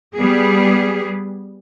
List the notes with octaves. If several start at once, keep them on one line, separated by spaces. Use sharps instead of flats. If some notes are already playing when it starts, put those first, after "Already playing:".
G3 B3 G#4